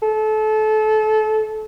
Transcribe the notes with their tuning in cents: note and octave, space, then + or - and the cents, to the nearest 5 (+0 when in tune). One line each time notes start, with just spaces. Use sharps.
A4 -25